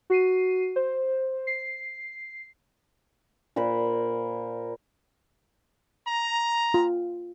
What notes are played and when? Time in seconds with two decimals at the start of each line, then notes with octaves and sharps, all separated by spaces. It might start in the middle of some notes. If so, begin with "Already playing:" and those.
0.10 F#4 C7 D#7
0.76 C5
1.47 C7
3.56 A#2 A#4 C5 B5
6.08 A#5
6.74 F4